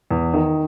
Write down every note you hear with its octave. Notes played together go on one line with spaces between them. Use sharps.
E2
D#3